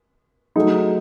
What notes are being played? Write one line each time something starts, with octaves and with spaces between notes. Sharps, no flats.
F#3 A3 D#4 G#4